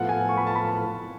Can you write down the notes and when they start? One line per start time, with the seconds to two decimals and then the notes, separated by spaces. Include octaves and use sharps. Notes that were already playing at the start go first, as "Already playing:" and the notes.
Already playing: A2 F3 B3 F4 A4 F#5
0.09 G#5
0.29 C#6
0.37 B5
0.47 A5
0.55 B5